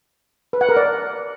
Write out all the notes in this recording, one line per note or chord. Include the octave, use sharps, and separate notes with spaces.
B4
F#5
A#4
D5